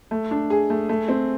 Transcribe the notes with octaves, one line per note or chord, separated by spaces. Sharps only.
A3
D4
G#4
A3
A3
C4